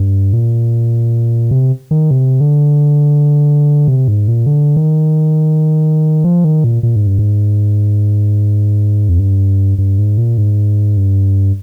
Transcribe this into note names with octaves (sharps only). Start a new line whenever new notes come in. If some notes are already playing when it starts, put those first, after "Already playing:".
Already playing: G2
A#2
C3
D#3
C3
D3
C3
G#2
A#2
D3
D#3
F3
D#3
A#2
A#2
G#2
G2
G#2
F2
G2
G2
G#2
A#2
G#2
G2